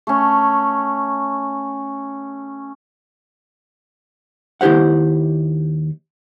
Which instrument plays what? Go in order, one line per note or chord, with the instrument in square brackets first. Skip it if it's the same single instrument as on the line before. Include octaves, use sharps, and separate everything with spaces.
[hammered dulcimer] A3 C#4
[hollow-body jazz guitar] D#2 E4 G4 C5 F#5